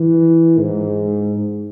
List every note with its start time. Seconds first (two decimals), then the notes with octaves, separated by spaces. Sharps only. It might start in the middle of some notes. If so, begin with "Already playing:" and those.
Already playing: E3
0.59 G#2